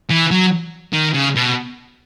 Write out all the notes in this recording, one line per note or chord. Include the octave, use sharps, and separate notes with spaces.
E3
F#3
D#3
C#3
B2